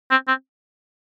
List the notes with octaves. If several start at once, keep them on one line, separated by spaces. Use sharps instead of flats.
C4
C4